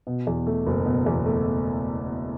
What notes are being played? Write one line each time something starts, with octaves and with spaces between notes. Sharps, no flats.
B2
E2
A3
F#1
B2
E2
A3